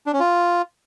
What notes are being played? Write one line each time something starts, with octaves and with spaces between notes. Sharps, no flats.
D4
C#4
F4